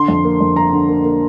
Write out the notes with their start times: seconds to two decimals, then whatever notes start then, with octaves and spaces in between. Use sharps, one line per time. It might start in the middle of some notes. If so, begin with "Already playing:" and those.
Already playing: D3 C6
0.08 F2
0.24 A#3
0.41 F2
0.56 A#3 A#5
0.73 D3
0.89 A#3
1.04 A#3